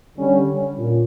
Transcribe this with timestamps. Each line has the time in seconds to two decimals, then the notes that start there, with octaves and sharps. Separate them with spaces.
0.18 D3 G3 C#4
0.76 A#2